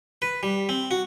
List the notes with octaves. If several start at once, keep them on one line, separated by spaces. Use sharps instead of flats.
B4
G3
C4
F#4